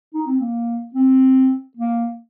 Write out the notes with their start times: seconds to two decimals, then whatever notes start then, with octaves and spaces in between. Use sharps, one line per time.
0.14 D#4
0.26 C4
0.40 A#3
0.94 C4
1.77 A#3